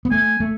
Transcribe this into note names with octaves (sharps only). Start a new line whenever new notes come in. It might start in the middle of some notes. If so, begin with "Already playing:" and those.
B3
A3 G#5
A3